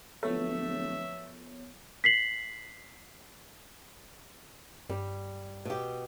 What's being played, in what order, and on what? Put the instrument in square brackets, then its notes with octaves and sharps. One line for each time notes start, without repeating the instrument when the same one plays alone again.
[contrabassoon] D1 [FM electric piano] F3 B3 C#5 [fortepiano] A3 [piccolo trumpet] E5
[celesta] B6 C7 F#7
[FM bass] G2 [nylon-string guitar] G3
[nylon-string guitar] B2 G4